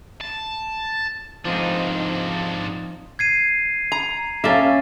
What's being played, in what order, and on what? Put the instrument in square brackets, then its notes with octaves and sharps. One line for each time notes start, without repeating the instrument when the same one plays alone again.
[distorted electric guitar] A5
[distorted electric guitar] G#2 D4 [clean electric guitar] F3 C4 D#4
[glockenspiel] G#6 C7 D#7
[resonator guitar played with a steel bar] A#5
[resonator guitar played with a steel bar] A#3 A4 [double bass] C#4 [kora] E5 F5